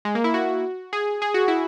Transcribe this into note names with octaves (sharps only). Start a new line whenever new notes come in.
G#3
A#3
E4
F#4
G#4
G#4
F#4
E4